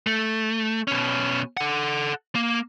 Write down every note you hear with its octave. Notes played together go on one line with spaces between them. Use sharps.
A3
B2 C#4
A4 F#5
A#3